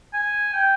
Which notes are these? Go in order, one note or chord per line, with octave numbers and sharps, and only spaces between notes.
G#5
G5